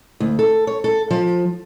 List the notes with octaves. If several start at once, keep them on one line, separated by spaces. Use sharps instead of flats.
D2
A4
C#5
A4
F3